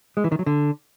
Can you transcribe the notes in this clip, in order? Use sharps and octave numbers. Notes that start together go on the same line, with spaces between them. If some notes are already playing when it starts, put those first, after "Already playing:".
G#3
E3
D#3
F#3
D3